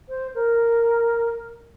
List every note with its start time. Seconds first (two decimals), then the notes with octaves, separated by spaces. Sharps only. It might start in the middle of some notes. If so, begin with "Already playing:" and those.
0.09 C5
0.35 A#4